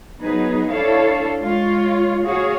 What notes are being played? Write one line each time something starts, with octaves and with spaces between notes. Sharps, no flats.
F#3 B3 D#4 G#4 B4
D4 E4 A4 C#5 F5
G#3 F4 C#5
D2 F#4 G#4 C#5 F5